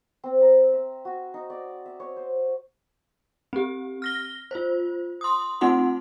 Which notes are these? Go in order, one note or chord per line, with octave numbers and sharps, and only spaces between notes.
C4
A#5
E5
F#4
D#4
D5
E5
C#5
C5
C4 G4
F6 A#6 G7
F4 C5
C6 D#6
A3 C4 D#4 F4 F#5 C6